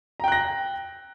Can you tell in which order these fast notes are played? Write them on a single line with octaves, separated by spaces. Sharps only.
A#5 G5 F#6 A#6